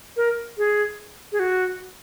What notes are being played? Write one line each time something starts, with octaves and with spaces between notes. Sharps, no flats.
A#4
G#4
G#4
F#4